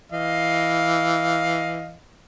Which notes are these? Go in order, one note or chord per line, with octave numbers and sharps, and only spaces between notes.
E3 D#5 F5